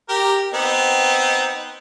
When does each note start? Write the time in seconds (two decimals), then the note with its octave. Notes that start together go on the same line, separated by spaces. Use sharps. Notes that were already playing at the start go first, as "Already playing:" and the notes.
0.09 G4 A#4
0.53 B3 C4 D#4